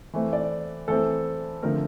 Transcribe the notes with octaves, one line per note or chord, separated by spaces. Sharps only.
E3 A3 C4
D5
E3 A3 C4 A4
D3 F3 A3 C4 A#4